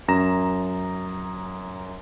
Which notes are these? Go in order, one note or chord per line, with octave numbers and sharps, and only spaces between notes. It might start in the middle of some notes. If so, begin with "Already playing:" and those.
F#2 A#5 A#6 E7